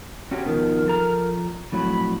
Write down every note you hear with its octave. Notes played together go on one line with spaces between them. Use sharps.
C#4 F#4 G4 C#5
B2 D#3 F3 A#4
F3 A4 A#5
F2 A2 F#3 B5